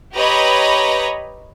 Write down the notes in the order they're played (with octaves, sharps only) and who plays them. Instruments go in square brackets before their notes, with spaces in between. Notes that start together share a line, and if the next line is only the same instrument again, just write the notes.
[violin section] G4 B4 C#5 D#5 A#5 B5